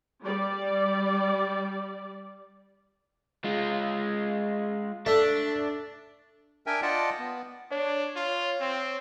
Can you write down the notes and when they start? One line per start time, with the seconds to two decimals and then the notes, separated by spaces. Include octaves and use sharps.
0.24 G3 D5
3.44 G#3 F4
5.06 A3 D4
6.66 D4 A#4 E5 G5 G#5
6.82 F4 D5 D#5 F#5 G5 A5
7.19 B3
7.71 D4 C#5
8.16 F4
8.61 C4